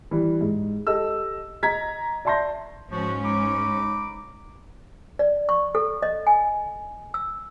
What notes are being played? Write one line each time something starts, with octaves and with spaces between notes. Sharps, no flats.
E3 G3
G#2
G4 A4 D#5 E6
D#5 A#5 G#6 B6
D5 E5 A5 C6 G6 A#6
G#2 F3 C#4 F#4
D#4 B5 D6
D5
C#6
A4
D#5
G#5
E6